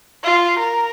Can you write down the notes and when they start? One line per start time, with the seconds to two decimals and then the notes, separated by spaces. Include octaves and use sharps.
0.24 F4
0.59 A#4